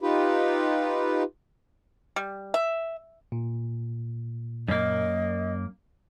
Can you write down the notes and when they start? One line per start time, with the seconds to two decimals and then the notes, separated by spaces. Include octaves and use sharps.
0.01 D#4 F4 G4 B4
2.16 G3
2.54 E5
3.32 A#2
4.68 F#2 A#3 D#5